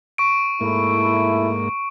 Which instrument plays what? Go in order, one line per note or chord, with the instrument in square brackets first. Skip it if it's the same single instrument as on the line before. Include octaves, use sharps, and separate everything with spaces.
[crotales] C#6 D7
[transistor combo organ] G#2 A#3 [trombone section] A3 E4